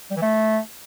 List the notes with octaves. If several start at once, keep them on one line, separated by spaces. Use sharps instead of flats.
G3
E3
A3